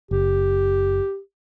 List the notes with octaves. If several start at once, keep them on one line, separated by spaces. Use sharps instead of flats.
F#1 G4